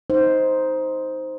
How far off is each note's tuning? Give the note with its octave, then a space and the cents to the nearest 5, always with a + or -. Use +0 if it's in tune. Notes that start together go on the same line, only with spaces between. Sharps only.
D#4 +15 C5 +0